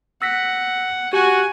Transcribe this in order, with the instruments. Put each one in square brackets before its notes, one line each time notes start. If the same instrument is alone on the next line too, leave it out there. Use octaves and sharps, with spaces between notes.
[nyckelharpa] F#5 [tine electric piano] E6 A#6 B6
[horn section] F#4 [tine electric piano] G4 [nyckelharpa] G#5